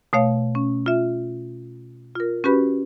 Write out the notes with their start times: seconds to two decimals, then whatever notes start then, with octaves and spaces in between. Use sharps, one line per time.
0.13 B2 A3 C#5 F5
0.55 C#4
0.86 F4 E5
2.15 F4 A#4
2.44 C#4 F#4 G4 B4 B5